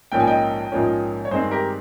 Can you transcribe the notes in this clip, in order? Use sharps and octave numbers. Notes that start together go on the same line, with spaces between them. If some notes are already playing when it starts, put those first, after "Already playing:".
A#1 G#2 F3 A#3 C#4 G5
G#5
D#5 G5
A#1 G#2 F3 A#3 C#4
C#5
G2 D#3 G#3 C4 G#4 C5
G4 A#4